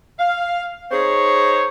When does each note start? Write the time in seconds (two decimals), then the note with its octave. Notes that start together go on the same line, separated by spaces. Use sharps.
0.19 F5
0.92 D#4 G#4 C5 C#5